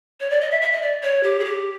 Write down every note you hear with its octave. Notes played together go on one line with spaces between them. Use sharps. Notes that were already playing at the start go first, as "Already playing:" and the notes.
C#5
D5
D#5
E5
E5
D#5
D5
C#5
G4
G#4
G4